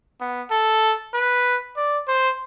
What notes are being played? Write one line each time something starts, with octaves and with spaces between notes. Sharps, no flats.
B3
A4
B4
D5
C5